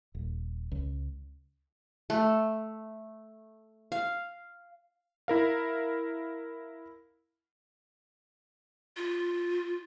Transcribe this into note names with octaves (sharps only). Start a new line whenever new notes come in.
D#1
C#2
A3
F5
E4 A#4 F5
F4